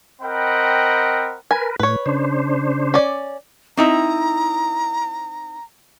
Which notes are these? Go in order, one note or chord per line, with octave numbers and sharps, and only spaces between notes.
C4 A#4 D#5 F#5 G5 B5
A#4 B4 G#5
A2 B4 C#5
C#3 D4 C5
C#4 D5
C4 D#4 E4 A#5